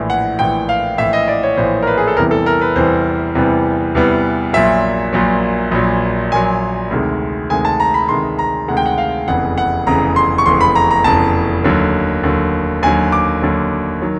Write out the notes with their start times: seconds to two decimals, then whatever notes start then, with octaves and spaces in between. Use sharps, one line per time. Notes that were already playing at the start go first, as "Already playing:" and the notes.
Already playing: A#1 A2 E3
0.10 F#5
0.39 A#1 A2 E3 G5
0.69 F5
0.98 A#1 A2 E3 E5
1.13 D#5
1.28 D5
1.43 C#5
1.57 A#1 A2 E3 C5
1.82 A#4
1.87 B4
1.97 G#4
2.08 A4
2.17 E2 C3 E3 G3 B3 A#4
2.31 A4
2.46 A#4
2.61 B4
2.76 E2 C3 E3 G3 B3 C5
3.35 E2 C3 E3 G3 B3
3.95 E2 C3 E3 G3 B3
4.53 A#1 A#2 F#3 E5
5.13 A#1 A#2 F#3
5.71 A#1 A#2 F#3
6.32 A#1 A#2 F#3 G#5
6.91 D2 C3 D#3 G#3
7.50 D2 C3 D#3 G#3 G#5
7.65 A5
7.80 A#5
7.94 B5
8.09 D2 C3 D#3 G#3 C6
8.39 A#5
8.68 D2 C3 D#3 G#3 F#5
8.77 G5
8.86 F#5
8.98 F5
9.28 F1 E2 C#3 F#5
9.58 F#5
9.86 F1 E2 C#3 A#5
10.16 C6
10.38 C#6
10.46 F1 E2 C#3 C6
10.61 B5
10.75 A#5
10.91 A#5
11.04 F1 E2 C#3 A5
11.64 D#2 D3 F#3
12.23 D#2 D3 F#3
12.83 D#2 D3 F#3 G#5
13.12 D6
13.42 D#2 D3 F#3
14.01 D#3 F#3